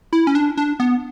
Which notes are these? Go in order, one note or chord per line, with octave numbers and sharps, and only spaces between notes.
E4
C#4
D4
D4
B3